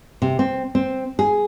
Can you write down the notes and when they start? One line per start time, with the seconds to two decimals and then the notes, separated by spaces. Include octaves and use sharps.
0.22 C3
0.39 C4
0.75 C4
1.19 G#4